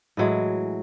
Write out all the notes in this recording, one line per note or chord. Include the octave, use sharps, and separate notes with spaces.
A2 E3 F#3 G#3